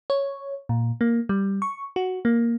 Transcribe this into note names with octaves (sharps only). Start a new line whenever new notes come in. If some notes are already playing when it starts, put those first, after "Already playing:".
C#5
A#2
A#3
G3
C#6
F#4
A#3